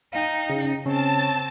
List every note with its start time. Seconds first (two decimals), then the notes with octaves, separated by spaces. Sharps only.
0.13 D#4 F5 G5
0.49 C#3
0.86 C#3 C4 C#4 A5